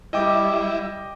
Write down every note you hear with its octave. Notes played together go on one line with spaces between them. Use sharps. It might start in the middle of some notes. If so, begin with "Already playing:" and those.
G3 E4 D#5 G5 D6